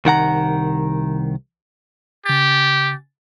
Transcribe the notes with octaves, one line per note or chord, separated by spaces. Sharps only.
C2 D#3 F#5 A#5
C#3 G4 A6